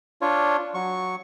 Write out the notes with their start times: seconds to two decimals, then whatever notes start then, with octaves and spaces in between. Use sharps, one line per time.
0.22 D4 F4 C#5
0.74 F#3 C#6